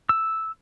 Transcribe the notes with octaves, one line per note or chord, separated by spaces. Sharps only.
E6